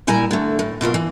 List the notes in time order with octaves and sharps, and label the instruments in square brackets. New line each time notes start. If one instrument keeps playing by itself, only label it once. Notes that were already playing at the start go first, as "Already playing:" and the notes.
[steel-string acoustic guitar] A#2 G3 E4 G#5 A#5
D3 A3
A2
B2 F#3 F4 A#4
E3